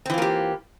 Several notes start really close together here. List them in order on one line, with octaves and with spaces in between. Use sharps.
C4 E3 F4 A#3 G4